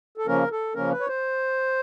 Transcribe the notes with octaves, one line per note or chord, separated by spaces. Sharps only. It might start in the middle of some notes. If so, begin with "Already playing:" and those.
A4
C#3 F3 A#3 C#4 A#4
A4
C#3 F3 A#3 C#4 A#4
B4
C#5
C5